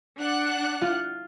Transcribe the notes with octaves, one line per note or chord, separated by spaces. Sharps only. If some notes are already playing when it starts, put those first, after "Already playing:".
D4 F#5 F#6
F4